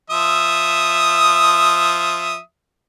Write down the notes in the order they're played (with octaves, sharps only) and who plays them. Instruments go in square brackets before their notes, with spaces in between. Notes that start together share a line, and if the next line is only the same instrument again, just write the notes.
[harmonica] F3 E5 D#6